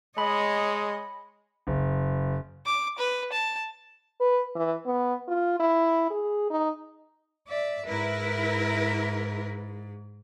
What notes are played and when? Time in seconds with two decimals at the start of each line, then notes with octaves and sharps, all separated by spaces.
0.18 G#3 C#5 D#5 B5
1.67 F#1
2.66 D6
2.98 B4
3.32 A5
4.20 B4
4.55 E3
4.86 B3
5.28 F4
5.60 E4
6.10 G#4
6.50 D#4
7.48 D5 E5
7.87 G#2 E4 A#4 B4